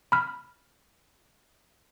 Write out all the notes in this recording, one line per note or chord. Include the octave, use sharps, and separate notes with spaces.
B5 F6